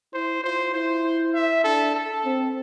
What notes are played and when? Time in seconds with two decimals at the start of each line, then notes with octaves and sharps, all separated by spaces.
0.14 E4 C5
0.43 F4 C5
0.73 E4 C5
1.34 E5
1.64 D4 A4
1.95 A4
2.25 C4